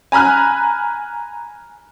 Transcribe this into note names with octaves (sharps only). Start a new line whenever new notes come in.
G#5 A#5 B5 F6 F#6